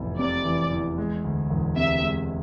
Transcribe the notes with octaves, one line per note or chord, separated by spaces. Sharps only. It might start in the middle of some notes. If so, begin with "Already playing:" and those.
Already playing: F1 E2 E3
C3 D5
E3
E2
G#3
D2
E1
C3 E5
G#3